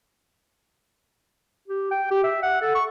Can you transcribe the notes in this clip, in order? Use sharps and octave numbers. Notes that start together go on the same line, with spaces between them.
G4
G5
G4
E5
F#5
A4
C#6